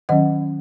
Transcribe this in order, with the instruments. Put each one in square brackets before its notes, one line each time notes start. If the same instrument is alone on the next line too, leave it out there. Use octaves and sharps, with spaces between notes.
[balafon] D#3 F#3 C#4 D#5 F#5